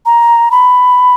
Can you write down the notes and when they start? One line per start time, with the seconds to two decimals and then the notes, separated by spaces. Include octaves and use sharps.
0.06 A#5
0.51 B5